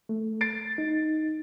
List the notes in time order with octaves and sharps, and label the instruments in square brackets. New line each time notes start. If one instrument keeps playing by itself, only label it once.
[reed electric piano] A3
[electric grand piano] A6 C7 D7
[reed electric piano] D#4